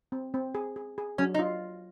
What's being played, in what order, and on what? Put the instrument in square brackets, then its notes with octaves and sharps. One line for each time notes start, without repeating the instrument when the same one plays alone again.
[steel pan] C4
C4
G#4
G#4
G#4
[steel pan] F#3 [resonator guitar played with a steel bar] C#4
[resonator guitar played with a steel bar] D#4
[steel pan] F4